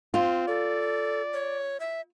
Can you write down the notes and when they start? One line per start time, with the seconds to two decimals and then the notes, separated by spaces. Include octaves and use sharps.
0.14 C4 F4
0.48 A4 D5
1.34 C#5
1.80 E5